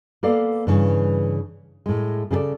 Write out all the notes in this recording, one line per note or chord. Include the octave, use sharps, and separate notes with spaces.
A#3 B3 A4 D5 F5
G2 C#3 E3
A2 G#3
C#3 D4 G#4 A4 D5